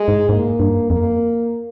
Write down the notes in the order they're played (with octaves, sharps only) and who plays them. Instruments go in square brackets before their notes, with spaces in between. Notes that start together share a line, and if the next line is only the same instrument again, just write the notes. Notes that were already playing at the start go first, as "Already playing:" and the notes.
Already playing: [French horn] G#3
[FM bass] G#2
[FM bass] G#2 [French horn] A#3
[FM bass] G2
[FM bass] F2 [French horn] A#3